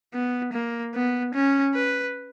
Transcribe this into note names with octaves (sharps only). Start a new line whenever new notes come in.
B3
A#3
B3
C#4
B4